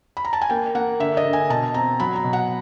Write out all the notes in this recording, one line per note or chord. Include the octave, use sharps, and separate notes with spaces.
B5
A#5
A5
G#5
A#3 G5
A#3 F#5
D3 E5
D#5
D3
G#5
B2 A5
C4 A#5
F#3 B5
A#5
B2
F#5